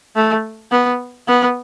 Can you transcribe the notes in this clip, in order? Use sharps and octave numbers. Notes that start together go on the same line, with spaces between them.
A3
B3
B3